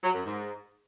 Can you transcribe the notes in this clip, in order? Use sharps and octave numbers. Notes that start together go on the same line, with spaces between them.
F#3
F#2
G#2